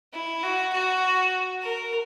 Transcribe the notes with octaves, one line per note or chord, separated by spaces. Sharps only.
E4
F#4
F#4
A#4